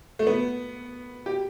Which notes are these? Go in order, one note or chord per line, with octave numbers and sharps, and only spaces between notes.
A3
B3
G4